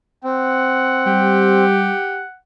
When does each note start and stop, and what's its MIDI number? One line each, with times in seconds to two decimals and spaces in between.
0.24 1.65 60
0.24 2.38 78
1.07 1.91 55
1.07 2.22 67